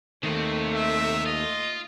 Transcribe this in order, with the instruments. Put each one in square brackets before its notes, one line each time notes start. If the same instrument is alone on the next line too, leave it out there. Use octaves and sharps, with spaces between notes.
[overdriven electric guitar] D#2 D#3 [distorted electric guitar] C3 C4 [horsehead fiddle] A3
[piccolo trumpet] E5
[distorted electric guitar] F4 [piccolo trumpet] D#5